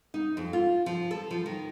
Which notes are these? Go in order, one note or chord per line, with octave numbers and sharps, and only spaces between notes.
D#4
F2
F4
F3
A4
F3
D#3